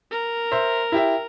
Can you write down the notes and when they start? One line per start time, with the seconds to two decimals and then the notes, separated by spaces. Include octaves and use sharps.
0.11 A#4
0.52 C5 E5
0.92 E4 G4 E5